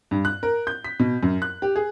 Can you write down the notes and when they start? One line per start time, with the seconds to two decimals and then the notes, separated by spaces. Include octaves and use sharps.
0.11 G2
0.25 F#6
0.43 A#4
0.67 G6
0.85 B6
0.99 B2
1.23 F#2
1.42 F#6
1.62 G4
1.76 G#4